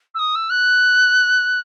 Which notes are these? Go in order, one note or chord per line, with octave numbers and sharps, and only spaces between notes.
E6
D#6
E6
F#6